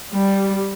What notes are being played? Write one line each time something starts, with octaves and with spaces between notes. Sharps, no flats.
G3